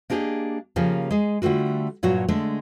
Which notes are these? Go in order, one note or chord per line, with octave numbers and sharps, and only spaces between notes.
A#3 D4 G4 G#4 D#5
C#3 F3 A#3 G4 G#4
G#3 G#4
D3 G3 A3 F4 F#4
G2 A#2 F#3 F#4 C#5
D3 G#3 A3 D4